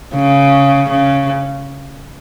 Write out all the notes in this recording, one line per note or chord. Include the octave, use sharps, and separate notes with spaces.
C#3
C#3